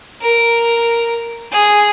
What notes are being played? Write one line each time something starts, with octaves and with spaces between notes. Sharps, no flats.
A#4
G#4